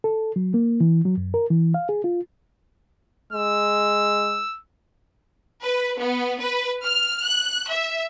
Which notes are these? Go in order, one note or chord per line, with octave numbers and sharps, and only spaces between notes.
A4
F#3
A#3
E3
F#3
F#2
A#4
E3
F5
G#4
F4
G#3 E6
B4
B3
B4
F6
F#6
E5